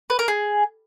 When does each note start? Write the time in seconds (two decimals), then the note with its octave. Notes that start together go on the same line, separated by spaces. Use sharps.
0.10 B4
0.19 A#4
0.28 G#4